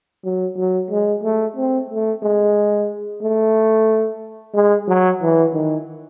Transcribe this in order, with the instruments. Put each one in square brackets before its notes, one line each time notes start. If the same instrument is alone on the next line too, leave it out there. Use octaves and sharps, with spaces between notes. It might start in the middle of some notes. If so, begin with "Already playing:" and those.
[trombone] F#3
F#3
G#3
A3
C4
A3
G#3
A3
G#3
F#3
E3
D#3